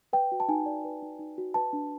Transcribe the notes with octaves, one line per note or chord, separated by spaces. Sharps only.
B4 G5
F#4
A5
D#4 G#5
D5
B4
D#4
D#4
F#4
B4 A5
D4